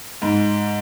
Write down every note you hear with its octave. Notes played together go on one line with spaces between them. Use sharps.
G#2